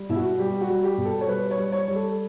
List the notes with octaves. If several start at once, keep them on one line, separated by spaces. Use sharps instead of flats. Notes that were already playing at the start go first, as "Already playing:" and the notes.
Already playing: G3
B2 E4
F#4
G3 G4
F#4
G3
G4
B2
A4
C#5
G3 B4
C#5
G3
C#5
G3
A4